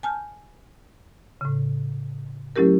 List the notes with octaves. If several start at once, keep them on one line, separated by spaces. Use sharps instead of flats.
G#5 A5 F6 G6
A2 C#3
F#3 A3 C#4 E4 G4 A#4